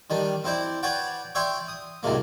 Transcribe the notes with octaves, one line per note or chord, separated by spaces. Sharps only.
D#3 G3 D4
C4 E4 C5 D5
B4 C#5 D5 F#5 G5 A5
C#5 D5 E5 G5 C6 C#6
D#6
C2 F#2 A2 C3 G#3 A#3